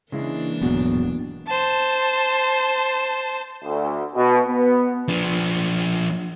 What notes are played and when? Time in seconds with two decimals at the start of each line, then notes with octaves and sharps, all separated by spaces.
0.12 C#3 E3 G#3 A#3 D4 E4
0.61 D#1 G#2 B2 F#3 B3
1.46 C5 A5
3.64 D2
4.15 B2
4.46 B3
5.08 F3 D4